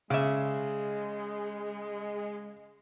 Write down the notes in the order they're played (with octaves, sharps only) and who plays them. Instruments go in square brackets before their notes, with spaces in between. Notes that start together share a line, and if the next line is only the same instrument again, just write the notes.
[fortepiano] C#3 [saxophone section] G#3 [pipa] D5 E5